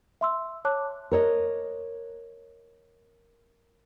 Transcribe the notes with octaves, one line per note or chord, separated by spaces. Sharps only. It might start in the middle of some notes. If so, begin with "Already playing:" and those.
E5 C6 E6
C#5 A5 D6 F#6
A#4 C#5 D#5